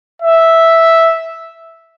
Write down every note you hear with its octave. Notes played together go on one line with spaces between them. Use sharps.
E5